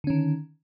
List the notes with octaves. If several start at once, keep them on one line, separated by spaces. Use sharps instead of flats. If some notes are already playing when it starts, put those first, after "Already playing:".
D3 D#3 C#4